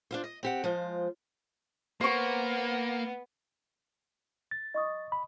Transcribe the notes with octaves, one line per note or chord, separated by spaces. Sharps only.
D4 F4 C5
D#5
C4 G4 F#5
F3 G#3 F4 C5
A#3 B3 C5 C#6
A6
D#5 C#6 D#6
B5